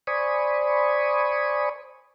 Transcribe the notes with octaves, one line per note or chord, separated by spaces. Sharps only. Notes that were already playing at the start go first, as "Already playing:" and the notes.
C5 D5 G#5 B5 C#6 D#6